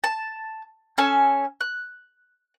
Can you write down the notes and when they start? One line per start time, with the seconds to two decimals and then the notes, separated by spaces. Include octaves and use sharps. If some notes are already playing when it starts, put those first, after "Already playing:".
0.04 A5
0.98 C#4 A4 G#5 E6
1.61 F#6